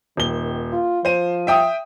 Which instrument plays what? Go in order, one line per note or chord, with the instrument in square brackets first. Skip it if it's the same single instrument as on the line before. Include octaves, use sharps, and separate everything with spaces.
[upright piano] D#1 G7 [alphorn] D#3
[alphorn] F4
[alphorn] F3 [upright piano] C5 D#7
[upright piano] E5 G5 D#6